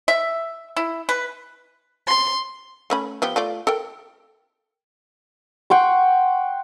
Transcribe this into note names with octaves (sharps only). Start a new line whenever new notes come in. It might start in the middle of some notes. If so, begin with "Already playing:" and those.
E5
E4
B4
C6
A3 C#4 B5
F3 B3 G4
A3 F4 D5
A4 A#4 G5
F#5 G5 C6 C#6